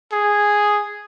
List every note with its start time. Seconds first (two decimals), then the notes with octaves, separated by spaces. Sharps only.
0.12 G#4